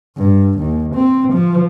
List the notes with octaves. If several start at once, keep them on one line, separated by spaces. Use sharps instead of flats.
G2
D#2
C4
F3